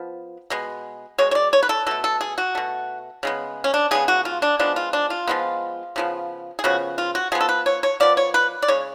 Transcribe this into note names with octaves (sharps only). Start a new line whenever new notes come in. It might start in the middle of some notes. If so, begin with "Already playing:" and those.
Already playing: F3 B3
B2 G#3 B3
B2 G#3 C#5
C#5
D5
C#5
B4
A4
B2 A3 A4
A4
G#4
F#4
B2 A3
C#3 G#3 B3
C#4
D4
C#3 G#3 B3 G#4
F#4
F4
D4
F3 G#3 B3 D4
F4
D4
F4
F3 G#3 B3
C#3 F3 B3
G#4
C#3 F3 B3 F#4
F4
F#4
F3 B3 G#4
A4
B4
C#5
C#5
F3 B3 D5
C#5
B4
D5
C#3 G#3 C#5